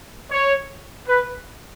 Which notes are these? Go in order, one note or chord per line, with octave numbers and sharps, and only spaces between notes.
C#5
B4